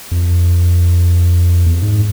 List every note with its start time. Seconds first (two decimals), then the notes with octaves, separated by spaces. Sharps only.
0.11 F2
1.66 E2
1.74 F2
1.82 G#2